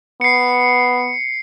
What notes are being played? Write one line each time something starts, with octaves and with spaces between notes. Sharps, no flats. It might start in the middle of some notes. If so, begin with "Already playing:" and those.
B3 C7 C#7